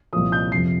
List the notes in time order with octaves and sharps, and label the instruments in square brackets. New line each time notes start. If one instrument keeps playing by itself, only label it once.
[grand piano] C2 A#2 F3 D#6
G6
F2 C3 F3 C7